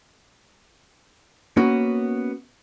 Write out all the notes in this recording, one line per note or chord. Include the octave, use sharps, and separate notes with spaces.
A#3 B3 C#4 F#4